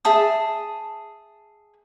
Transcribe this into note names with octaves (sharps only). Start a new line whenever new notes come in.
G#4 E5 A5 D#6